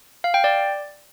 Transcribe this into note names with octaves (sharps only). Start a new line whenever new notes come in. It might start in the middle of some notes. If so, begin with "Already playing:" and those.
F5
G5
D5